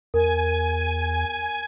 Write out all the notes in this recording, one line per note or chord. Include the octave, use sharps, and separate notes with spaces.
E2 A#4 G#5